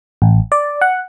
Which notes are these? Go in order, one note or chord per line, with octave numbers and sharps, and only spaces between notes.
A1
D5
F#5